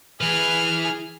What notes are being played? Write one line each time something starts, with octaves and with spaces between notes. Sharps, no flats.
E3 G#4 B4 F6